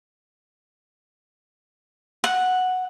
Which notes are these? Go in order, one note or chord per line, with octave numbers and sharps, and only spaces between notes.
F#5